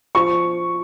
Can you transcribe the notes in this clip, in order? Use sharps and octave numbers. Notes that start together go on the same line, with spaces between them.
F3 C#6